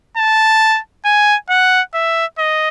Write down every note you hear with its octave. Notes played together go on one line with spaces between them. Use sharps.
A5
G#5
F#5
E5
D#5